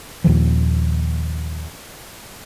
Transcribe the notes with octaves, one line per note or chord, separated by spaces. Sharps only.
D#2 A#2 D#3 F3